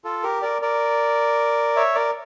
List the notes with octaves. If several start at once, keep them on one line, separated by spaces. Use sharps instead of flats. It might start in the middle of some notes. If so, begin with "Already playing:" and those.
F4 A4
G4 A#4
A#4 D5
A#4 D5
C#5 E5
A#4 D5